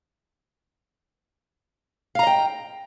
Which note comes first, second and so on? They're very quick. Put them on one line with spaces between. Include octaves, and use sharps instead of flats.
F5 A#5 D#5 G5